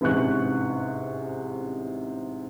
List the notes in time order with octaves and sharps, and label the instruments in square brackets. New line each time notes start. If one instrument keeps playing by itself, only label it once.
[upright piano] A1 G#2 C3 C#4 C#6 F#6